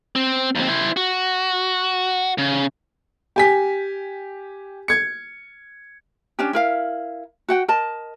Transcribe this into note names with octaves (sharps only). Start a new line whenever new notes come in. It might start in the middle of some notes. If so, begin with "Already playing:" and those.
C4
D#2 C4
E4 C5
F#4
C#3
G4 G#5 B6
G#6 C#7
C#4 D4 G4
E4 A#4 F5
F#4 F#5 G5
A#4 D#5 A5